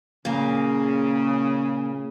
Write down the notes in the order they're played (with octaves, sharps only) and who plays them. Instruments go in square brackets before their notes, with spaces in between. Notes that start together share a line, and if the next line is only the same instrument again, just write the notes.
[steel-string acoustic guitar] A#2 A#3 [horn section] C#3